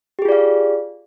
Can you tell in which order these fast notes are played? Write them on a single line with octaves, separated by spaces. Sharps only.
G4 G#4 F4 D5 F5